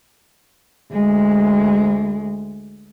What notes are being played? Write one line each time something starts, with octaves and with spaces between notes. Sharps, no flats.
D2 G#3